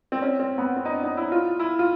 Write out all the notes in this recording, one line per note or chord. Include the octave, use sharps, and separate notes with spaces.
C4
C#4
C4
B3
C4
D#4
D4
D#4
E4
F4
E4
F4